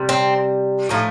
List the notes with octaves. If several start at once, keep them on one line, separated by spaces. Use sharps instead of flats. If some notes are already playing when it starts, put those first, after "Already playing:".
Already playing: C3 G3
C4
A2 F3 A3 D#4